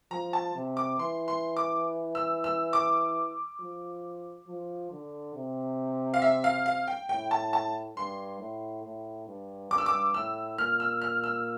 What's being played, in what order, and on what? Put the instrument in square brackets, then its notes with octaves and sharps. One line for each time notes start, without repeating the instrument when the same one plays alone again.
[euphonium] F3 [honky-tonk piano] A#5
[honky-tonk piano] A5
[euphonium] C3
[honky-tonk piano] D6
[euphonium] E3 [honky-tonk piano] C6
[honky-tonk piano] C6
D6
E6
E6
D6
[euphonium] F3
F3
D3
C3
[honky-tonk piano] F5
E5
F5
F5
G5
[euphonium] A2 [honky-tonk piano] G5
[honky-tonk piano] A5
A5
[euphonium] G2 [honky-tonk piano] C6
[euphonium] A2
A2
G2
[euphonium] G2 [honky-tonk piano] D6
[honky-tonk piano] E6
D6
[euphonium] A2 [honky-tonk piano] E6
[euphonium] A#2 [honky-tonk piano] F6
[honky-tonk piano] E6
F6
E6